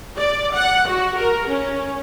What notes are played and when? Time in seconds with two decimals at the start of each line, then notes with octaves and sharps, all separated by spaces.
0.17 D5
0.55 F#5
0.88 F#4
1.19 A#4
1.50 C#4